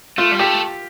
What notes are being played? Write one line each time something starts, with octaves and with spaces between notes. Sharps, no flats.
A3 F4
G3
A3 G4